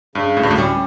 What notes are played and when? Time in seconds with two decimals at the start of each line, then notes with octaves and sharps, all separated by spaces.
0.15 G2 C#3
0.36 D2 A2
0.43 G2
0.51 A2
0.58 G3 C#4